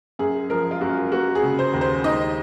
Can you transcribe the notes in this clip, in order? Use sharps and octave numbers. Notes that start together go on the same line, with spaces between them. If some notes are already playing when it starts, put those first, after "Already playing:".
F#2 G#4
F3 A#4
F4
F#2 F#4
A#3 F#4
G#4
C#3
C5
D#2
C5
D#4 D#5